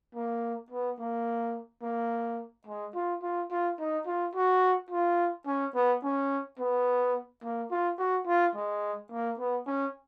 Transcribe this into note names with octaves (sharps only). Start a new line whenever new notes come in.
A#3
B3
A#3
A#3
G#3
F4
F4
F4
D#4
F4
F#4
F4
C#4
B3
C#4
B3
A#3
F4
F#4
F4
G#3
A#3
B3
C#4